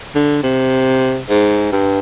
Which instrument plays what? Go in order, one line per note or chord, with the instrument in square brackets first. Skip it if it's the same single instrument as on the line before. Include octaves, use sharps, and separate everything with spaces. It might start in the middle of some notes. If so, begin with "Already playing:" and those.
[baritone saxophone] D3
C3
G#2
G2